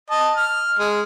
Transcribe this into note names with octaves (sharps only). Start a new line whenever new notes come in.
D#5 A5
F6
G#3